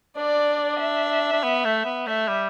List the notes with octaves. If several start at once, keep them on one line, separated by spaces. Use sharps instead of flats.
D4 D5
E5
D4
B3
A3
B3
A3 E5
G3